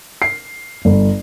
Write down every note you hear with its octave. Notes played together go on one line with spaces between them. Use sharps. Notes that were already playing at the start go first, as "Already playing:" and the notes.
C7
G1